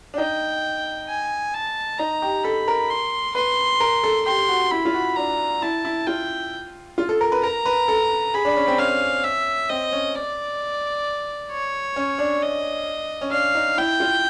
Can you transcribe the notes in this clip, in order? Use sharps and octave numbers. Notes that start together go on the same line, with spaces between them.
D4
D#4 G5
G#5
A5
D#4 A#5
G4
A4 B5
A#4
C6
B4 C6
A#4
A4
G4 C6
F#4
E4 B5
F4
F#4
D4 A#5
E4 A5
E4
F4 G5
F4
A4
A#4
B4
A#4 A#5
B4
A4
G#4 B5
D4
C#4
C4
C#4 F5
E5
C4 D#5
C#4
D5
C#5
C#4
D4
D#5
C#4
D4 F5
D#4
E4 G5
F4